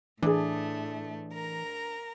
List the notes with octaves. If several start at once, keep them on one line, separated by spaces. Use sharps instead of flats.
A2 E3 A3 D4 G#4
A#4 A#5